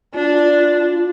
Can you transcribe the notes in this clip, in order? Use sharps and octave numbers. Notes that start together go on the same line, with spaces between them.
D4 F4